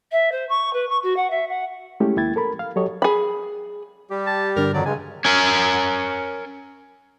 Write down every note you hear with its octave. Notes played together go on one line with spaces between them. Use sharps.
E5
C5
C#6
B4
C#6
F#4
F#5
E5
F#5
G#3 A3 C#4 E4 G4
D#2 A#3 E4 G5 G#6 A6
A4 A#4 B5
F5
F#3 F#4 G4 A4 C#5 D#5
G#4 B5
G3 G4
A5
G2 D3 D4 A#4
F2 D#3 F#3 D5
G2 C#3 G#3 G#5
C#4 A#4